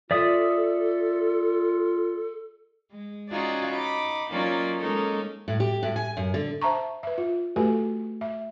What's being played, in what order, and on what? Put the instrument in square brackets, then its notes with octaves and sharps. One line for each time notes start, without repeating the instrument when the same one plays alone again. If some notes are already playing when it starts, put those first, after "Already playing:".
[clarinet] F4 [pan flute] A4 [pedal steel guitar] D5 E5 D#6
[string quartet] G#3
C#4 D#4 F4 F#4 G#4 D5
D#4 B5 D6
F#3 A#3 C#4 D#4 F4 D5
G#3 A#3 C#4 D#4 A4 A#4
[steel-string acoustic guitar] A2
G4
A2
G#5
F#2
D3
[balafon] C5 E5 A5 A#5 C#6
B4 E5
F4
A3 F#4 G4 A4 B4 G#5
E5